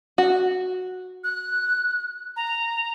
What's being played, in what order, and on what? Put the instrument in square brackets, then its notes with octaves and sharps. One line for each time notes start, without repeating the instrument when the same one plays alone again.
[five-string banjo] F#4
[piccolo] F#6
A#5